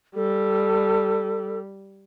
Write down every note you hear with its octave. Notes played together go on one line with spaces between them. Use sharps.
G3 A4